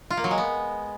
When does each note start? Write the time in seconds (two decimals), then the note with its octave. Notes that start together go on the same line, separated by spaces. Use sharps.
0.10 F4
0.17 A#3
0.24 F#3
0.31 G#3
0.38 B3